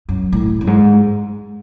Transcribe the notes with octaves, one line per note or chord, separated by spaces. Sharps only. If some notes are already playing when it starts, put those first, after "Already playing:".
F#2
A2
F#2
G#2